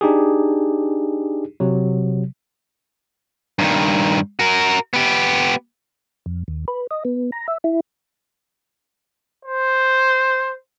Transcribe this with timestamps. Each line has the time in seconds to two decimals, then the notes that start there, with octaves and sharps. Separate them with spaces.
0.01 D4 D#4 G4 G#4
1.60 C3 F#3
3.59 G2 D#3
4.39 F#4 A#4
4.94 B3 G4
6.26 F2
6.48 D#2
6.68 B4
6.91 D#5
7.05 B3
7.32 A#5
7.48 E5
7.64 E4
9.45 C5